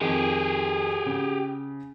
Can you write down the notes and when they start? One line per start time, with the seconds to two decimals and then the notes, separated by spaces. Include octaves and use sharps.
0.01 F2 D#3 G4 G#4
1.06 C#3